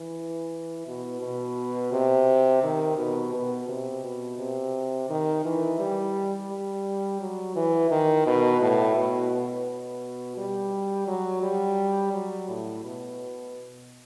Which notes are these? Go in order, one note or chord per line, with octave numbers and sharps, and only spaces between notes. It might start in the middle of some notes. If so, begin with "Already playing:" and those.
Already playing: E3
B2
B2
C3
D#3
B2
B2
C3
B2
C3
D#3
E3
G3
G3
F#3
E3
D#3
B2
A2
B2
B2
G3
F#3
G3
F#3
A2
B2